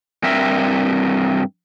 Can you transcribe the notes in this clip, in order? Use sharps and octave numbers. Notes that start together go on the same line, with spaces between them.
G2 C4 A#4 E5